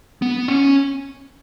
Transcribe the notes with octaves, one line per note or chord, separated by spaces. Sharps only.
B3
C#4